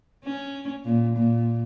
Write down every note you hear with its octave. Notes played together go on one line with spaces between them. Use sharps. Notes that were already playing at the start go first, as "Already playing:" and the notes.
C#4
A#2
A#2